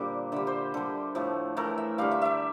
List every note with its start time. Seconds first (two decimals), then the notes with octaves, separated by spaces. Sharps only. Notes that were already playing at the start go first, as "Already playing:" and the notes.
Already playing: A#2 D3 G3 C5 D5
0.32 D3 G3 E5
0.47 C5
0.74 D3 G3 A4
1.15 A2 F3 A3
1.57 A2 E3 A3 A#4
1.78 E5
1.98 D3 G3 F5
2.11 E5
2.21 D5 E5